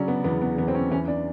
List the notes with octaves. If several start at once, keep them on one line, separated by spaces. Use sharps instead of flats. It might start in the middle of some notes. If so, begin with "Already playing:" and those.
Already playing: C#3 F#3 C#4 D4
B3
E2 B3
B3
E2 B3
C4
C#4
E3 C#4
D4